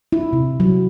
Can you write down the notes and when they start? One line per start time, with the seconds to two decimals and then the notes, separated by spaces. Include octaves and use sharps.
0.12 E4
0.33 C3
0.60 F#3